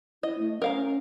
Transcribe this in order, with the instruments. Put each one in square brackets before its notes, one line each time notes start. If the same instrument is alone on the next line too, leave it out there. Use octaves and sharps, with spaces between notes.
[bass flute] E4 [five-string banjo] D#5
[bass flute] A3
[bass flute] C#4 [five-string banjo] A#4 F5 A#5